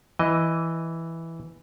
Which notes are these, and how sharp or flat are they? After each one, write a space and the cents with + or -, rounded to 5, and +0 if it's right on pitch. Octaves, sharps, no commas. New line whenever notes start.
E3 +0 D#5 +0